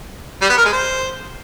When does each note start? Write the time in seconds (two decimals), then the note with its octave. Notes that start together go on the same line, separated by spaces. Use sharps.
0.42 G3
0.50 B3
0.57 A#4
0.65 G#3
0.73 C5